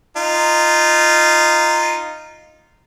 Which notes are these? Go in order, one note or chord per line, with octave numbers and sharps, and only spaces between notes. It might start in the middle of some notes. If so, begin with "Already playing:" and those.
D#4 F4